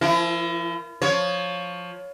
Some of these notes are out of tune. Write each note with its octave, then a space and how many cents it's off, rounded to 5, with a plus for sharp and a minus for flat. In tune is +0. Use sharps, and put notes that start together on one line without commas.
F3 -25 E4 +30 A#4 +0
F3 +15 C#5 +10